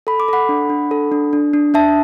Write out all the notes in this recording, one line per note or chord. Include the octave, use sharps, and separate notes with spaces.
A4 B5
D6
A4 F#5 B5
D4
D4
A4
D4
D4
D4
D4 E5 A5